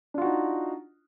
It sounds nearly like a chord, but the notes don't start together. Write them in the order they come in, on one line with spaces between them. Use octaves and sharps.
D4 F4 F#4 D#4